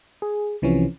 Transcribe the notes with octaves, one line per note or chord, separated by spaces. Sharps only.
G#4
C2 C3 E3 F3 C#4